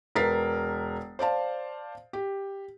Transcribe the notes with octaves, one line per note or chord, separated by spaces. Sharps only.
E1 A#4 B4 A6 B6 C7
C5 D5 F5 A5
G4